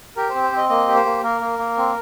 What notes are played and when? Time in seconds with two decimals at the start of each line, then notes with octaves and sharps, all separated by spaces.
0.16 G4 A#4
0.29 C5
0.35 C4
0.43 C5
0.52 C4 D#5
0.69 A#3 D#5
0.88 G4
0.96 C5
1.05 A#3
1.23 A#3 A#4
1.41 A#3
1.58 A#3
1.77 C4